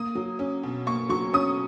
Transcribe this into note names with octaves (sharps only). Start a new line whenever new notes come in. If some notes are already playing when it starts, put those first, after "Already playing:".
Already playing: A#3 D#6
F#3
C#4
B2
A#3 C#6
F#3 C#6
C#4 D#6